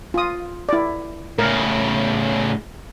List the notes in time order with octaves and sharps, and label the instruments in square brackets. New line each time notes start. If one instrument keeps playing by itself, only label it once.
[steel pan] F4 D#6
E4 D5
[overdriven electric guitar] A2 C#3 [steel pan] A#4